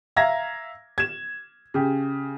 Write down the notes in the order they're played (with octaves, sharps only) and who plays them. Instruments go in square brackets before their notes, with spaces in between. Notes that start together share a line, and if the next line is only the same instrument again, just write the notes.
[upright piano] E5 F5 A#5 G#6 A#6
G#6 E7
C#3 G4